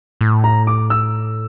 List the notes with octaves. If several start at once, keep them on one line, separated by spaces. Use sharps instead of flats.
A2
A#5
D6
E6